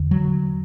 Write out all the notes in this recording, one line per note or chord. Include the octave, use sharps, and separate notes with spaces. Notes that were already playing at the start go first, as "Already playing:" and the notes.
Already playing: E2 D3
F#3